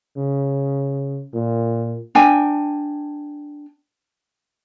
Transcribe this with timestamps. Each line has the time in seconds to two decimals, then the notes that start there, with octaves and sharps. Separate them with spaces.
0.17 C#3
1.34 A#2
2.15 D4 G5 G#5